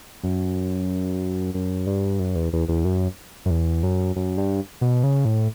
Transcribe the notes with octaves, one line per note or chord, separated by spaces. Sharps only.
F#2
F#2
G2
F#2
E2
E2
E2
F#2
F#2
E2
F#2
F#2
G2
B2
C#3
A2